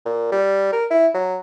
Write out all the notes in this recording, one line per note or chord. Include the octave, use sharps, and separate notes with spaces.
A#2
G3
A#4
E4
F#3